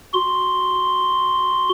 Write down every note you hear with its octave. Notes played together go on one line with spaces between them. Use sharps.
F#4 C6